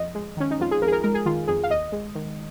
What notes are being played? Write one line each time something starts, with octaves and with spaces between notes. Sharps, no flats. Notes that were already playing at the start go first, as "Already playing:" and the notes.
Already playing: F2 D#5
G#3
D#3 C#4
D#4
F2 F4
G#4
F2 A#4
G#4
A#4
G#3 A#4
G#4
D#3 F4
F2 G#4
F5
D#2 D#5
G#3
D#3